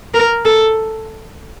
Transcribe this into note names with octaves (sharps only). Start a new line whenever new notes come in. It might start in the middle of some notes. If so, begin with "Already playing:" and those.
A#4
A4